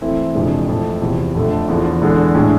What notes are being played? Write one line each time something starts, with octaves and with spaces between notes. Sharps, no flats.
E3 A3 C4 E4
F2 C3 E3 G#3 D4
F2 E3 A3
E2 C3 F3
F2 D3 A3
E2 D3 F3
E2 D3 G#3
A2 G#3 D4